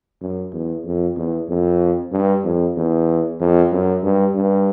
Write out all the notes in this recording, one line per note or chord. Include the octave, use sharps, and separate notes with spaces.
F#2
E2
F2
E2
F2
G2
F2
E2
F2
F#2
G2
G2